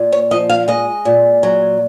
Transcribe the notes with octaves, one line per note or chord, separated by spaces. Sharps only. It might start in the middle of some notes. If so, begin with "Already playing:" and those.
Already playing: A#2
C#5
F3 D#5
F5
G#3 D#5
A#2
F#3